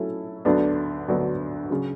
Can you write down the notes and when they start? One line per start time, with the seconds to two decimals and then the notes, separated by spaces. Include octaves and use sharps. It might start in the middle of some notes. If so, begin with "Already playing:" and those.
Already playing: F#3 A3 C#4 E4 A4
0.45 D2 D3 F#3 B3 D4
1.08 D2 D3 F#3 B3 D4
1.70 C#3 F#3